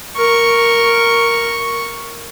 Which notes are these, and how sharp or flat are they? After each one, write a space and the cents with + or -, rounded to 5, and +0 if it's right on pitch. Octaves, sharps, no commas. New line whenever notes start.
A#4 +0 C#6 +0